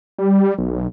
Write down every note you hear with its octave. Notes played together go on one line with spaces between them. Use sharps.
G3
B1